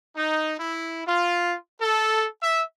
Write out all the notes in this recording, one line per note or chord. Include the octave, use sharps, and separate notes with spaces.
D#4
E4
F4
A4
E5